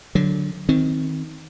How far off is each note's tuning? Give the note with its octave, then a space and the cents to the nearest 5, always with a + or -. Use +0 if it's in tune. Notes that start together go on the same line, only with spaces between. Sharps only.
D3 +0 F#3 +0
D#3 +20 C4 +0